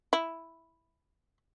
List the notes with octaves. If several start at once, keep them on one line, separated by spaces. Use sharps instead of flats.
E4